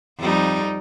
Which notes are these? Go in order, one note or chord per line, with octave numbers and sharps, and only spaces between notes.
F2 G3 D#4